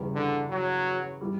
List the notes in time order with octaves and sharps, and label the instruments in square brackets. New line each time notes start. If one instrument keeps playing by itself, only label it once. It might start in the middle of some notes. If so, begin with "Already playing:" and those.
Already playing: [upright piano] E2 C#3 E3 G3
[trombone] D3
F#3
[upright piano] E3 G3